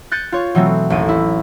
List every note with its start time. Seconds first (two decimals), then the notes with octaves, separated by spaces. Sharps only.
0.11 F#6 G6 A6 C#7 D#7
0.32 F4 C#5
0.55 B2 E3 F#3 A3 C4
0.90 A1 D#2 D#7
1.09 E4